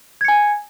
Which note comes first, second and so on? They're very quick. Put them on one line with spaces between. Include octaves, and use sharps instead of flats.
G#6 C#7 G#5